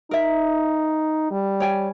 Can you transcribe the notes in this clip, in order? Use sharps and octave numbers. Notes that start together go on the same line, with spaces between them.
D#4 A#4 E5
G3
C#5 G5 G#5